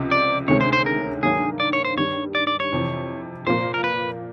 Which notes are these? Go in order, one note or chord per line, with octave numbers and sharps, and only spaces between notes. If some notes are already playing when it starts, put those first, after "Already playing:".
Already playing: C#2 C3 F3
D5
D2 C3 D#3 G#3 C#4 C#5
C5
C5
A#4
G2 D#3 F#3 A#3 G#4
D5
C#5
C5
G2 D#3 G3 C#5
D5
D5
C#5
F2 C3 E3
A#2 F3 A#3 C5
A#4
B4